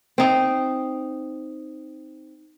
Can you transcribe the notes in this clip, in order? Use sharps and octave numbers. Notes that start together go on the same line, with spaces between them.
C4 D#4